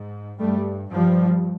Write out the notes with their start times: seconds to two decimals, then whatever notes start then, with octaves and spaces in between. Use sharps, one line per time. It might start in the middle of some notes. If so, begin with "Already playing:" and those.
Already playing: G#2
0.40 G2 G3 A3
0.93 G2 F3 G3